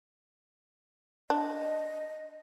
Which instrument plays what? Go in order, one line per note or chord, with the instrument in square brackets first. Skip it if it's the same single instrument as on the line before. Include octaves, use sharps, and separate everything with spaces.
[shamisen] D4 [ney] D#5